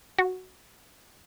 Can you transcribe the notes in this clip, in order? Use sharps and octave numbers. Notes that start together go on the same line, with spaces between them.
F#4